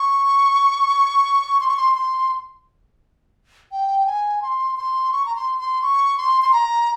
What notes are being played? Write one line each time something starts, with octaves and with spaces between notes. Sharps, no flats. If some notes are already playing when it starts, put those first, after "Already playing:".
Already playing: C#6
C6
C#6
C6
C6
G5
G#5
C6
C6
C#6
A#5
C6
C6
C#6
C6
C6
A#5